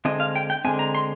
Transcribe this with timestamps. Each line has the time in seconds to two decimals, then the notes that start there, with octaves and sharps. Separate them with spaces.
0.05 D3 G#3 C4 D#5
0.20 F5
0.36 G5
0.50 G5
0.64 D3 G#3 C4 G#5
0.79 A#5
0.95 C6